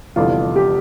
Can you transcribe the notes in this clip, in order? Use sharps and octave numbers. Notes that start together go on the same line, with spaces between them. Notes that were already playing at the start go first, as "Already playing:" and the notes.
F1 E2 D3 G3 F4
G4